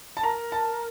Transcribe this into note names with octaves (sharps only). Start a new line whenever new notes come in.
A5
A#4 A#5
A5